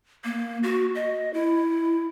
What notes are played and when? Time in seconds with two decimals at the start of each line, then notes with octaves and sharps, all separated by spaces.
0.24 A#3
0.63 F#4
0.95 D#5
1.34 E4